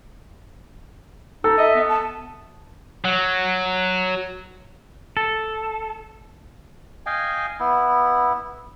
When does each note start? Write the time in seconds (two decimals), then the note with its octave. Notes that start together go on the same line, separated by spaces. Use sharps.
1.44 D#4 A4 E6
1.58 D#5 E5
1.75 B3
1.89 A5
3.05 F#3
5.17 A4
7.06 D#5 F5 G5 G#5
7.60 B3 E4